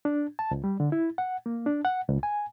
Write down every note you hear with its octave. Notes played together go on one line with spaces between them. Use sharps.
D4
A5
C#2
G3
D3
E4
F#5
A#3
D4
F#5
C#2
G#5